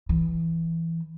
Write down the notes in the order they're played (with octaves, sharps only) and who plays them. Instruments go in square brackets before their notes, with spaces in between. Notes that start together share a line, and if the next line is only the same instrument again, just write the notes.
[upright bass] E3